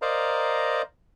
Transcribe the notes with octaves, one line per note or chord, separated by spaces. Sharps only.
A#4 C5 D5 D#5 F5 A#5